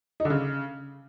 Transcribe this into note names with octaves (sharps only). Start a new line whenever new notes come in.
D#4
D3
C#3